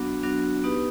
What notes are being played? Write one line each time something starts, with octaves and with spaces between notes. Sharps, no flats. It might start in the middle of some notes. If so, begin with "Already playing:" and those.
Already playing: F#3 B3 D4 F#4
F#3 B3 D4 F#4
B3 D#4 G4 B4